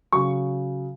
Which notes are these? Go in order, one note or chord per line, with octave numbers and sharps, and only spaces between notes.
C#3 F#3 C#6